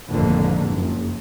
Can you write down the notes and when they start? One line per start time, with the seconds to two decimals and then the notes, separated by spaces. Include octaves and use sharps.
0.11 G#1 F2 A2 D3 A#3
0.69 F#1